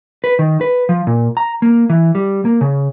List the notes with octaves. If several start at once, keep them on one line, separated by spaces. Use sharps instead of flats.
B4
D#3
B4
F3
A#2
A#5
A#3
E3
G3
A#3
C#3